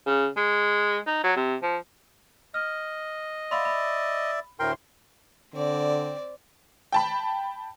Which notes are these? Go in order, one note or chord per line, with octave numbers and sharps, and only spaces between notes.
C#3
G#3
D#4
F#3
C3
F3
D#5 F6
D5 E5 F5 B5 C6
B5
D2 A2 A#4 G5 C6
D3 C4 D5
G5 A5 B5